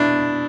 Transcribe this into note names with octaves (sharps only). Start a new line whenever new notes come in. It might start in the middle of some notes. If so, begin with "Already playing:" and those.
Already playing: B2 D4 E4